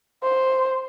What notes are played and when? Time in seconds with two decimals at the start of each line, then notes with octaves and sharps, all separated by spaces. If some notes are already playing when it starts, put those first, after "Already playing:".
0.24 C5